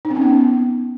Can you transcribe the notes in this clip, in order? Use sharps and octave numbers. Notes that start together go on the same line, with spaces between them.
D#4
C4
C#4
B3